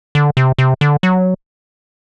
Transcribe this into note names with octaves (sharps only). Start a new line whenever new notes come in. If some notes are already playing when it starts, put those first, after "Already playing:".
D3
C3
C3
D3
F#3